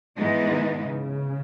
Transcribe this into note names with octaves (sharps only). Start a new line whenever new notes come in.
G#2 E3 G#3 B3 D#4
D#3
C#3